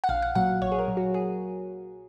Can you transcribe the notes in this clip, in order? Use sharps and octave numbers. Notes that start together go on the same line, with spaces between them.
F#5
A#1 F5
F#5
A#2 F#3 F#5
A#1 C#5
G#4
A#4
A#2 F#3
F#4
G#4